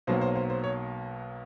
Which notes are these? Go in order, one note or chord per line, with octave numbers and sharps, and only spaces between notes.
B1 B2 F#3 A#3 C5
C5
C5
C5
C#5